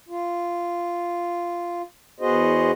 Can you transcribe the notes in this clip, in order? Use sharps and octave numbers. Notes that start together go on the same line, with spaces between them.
F4
E2 B3 F#4 G#4 C5 D#5